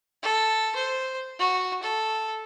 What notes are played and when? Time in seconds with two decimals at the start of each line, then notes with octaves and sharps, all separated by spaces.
0.23 A4
0.76 C5
1.39 F#4
1.83 A4